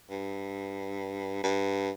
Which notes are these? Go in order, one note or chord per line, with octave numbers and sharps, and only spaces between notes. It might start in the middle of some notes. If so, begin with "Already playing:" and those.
G2
G2